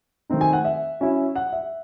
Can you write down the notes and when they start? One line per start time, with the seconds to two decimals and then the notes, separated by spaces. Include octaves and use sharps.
0.29 D#3 A3 C4 D#4
0.41 G#5
0.53 F#5
0.65 E5
1.00 F#3 C#4 E4
1.35 F#5
1.52 E5